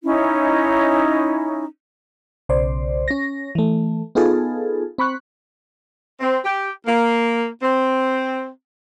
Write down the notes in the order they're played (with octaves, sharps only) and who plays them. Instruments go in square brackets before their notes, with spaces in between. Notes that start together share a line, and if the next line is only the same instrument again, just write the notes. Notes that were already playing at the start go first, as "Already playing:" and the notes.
[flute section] C#4 D#4 E4
[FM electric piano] B1 C#3 C5 D5
C#4 A#6
E3 A3
B3 D#4 F4 G#4 A4
C4 B5 C#6 F#6
[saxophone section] C4
G4
A#3
C4